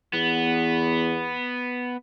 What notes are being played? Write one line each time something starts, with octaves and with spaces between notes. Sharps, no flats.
E2 B3